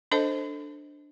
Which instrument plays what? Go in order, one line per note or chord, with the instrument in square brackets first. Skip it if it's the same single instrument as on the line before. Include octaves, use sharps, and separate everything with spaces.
[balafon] D4 A4 C5 D#5 A5